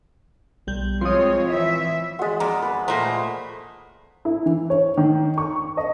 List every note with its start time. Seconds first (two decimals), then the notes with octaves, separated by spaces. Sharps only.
0.67 B1 G3 G6
1.01 F3 G#3 C4 F4 C#5 C6 D#6
1.46 E3 E5
2.19 G#3 F#4 D#5 F#5
2.40 F2 D5 A#5
2.62 B4
2.88 A#2 A3 C5 A#5 C6
4.25 E4
4.46 E3
4.70 C#5
4.97 D#3
5.38 C#6
5.77 D#5